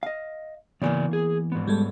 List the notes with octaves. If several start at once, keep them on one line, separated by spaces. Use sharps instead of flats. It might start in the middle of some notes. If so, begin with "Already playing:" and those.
D#5 F5
E2 C#3 E3 A#3 D5 G#5
G#4
G#2 B3
G3 G#3 A4